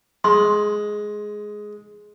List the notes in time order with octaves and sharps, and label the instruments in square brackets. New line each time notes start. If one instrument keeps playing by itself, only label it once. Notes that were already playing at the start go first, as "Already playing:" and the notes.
[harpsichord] G#3 [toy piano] C6